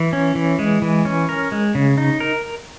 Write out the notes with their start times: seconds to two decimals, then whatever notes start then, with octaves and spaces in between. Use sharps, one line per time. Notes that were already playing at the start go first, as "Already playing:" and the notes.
Already playing: E3
0.13 C#4
0.35 E3
0.59 G#3
0.82 E3
1.05 C#4
1.29 A#4
1.52 G#3
1.75 C#3
1.98 D#4
2.20 A#4